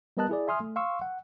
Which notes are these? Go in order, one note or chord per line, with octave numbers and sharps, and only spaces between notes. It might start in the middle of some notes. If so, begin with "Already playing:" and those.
G3 B3 A#4 D#5 A5 F#6
E4 G#4 D5
E5 G#5 C6 D#6 F6
A3
F5 C6 C#6 E6
F#5